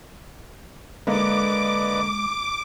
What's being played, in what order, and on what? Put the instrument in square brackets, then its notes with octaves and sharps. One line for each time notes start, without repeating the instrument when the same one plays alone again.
[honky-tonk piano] D3 A#3 [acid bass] G#3 [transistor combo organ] B4 D5 D#5 [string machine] D6